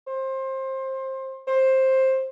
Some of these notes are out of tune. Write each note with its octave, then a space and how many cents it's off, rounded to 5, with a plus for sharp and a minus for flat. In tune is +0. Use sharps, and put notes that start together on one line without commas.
C5 +25
C5 +15